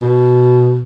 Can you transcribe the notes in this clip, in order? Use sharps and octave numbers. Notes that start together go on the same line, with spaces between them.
B2